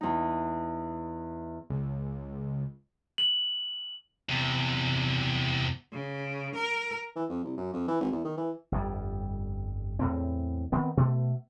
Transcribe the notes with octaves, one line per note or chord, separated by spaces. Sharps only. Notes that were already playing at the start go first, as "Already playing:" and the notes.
E2 D#4
C#2
F#7
E2 C3
C#3
A#4
E3
F2
C2
F#2
F2
E3
G#1
E2
D#3
E3
G1 F2 G3
E2 A2 C4
D#3 B3 C4
B2 A3